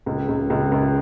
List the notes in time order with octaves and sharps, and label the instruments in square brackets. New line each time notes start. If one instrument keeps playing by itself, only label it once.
[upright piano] C#2
C#2
C#2
C#2